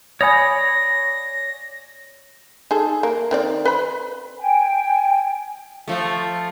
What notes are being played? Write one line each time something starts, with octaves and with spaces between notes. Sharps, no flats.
C#5 D5 F#5 G#5 B5 D#6 A#6
D#4 G#4 A4
A#3
D#3 C4 D5
B4 C5 B5
G5 G#5
F3 A3